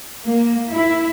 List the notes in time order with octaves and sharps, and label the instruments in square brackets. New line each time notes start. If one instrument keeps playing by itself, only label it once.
[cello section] A#3
E4